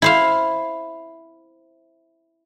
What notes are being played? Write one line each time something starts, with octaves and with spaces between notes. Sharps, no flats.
E4 C5 F5